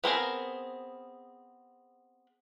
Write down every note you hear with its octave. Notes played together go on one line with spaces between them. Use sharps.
B3 C4 G#4 A#4